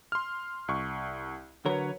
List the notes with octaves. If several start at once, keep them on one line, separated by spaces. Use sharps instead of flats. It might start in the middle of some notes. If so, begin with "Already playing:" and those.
C6 F6
C2 C#6
D3 F#3 A#4 B4 C#5